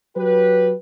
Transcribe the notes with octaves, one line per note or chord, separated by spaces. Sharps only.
F#3 G4 B4